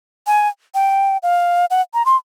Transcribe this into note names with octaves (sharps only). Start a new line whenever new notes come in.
G#5
G5
F5
F#5
A#5
C6